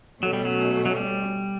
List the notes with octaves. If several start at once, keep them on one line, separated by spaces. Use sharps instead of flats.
B2 F#3 A3 C#4
G3
F#3
F#3
G3